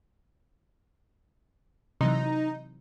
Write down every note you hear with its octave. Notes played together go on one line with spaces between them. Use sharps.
C3 E3 F#3 D#4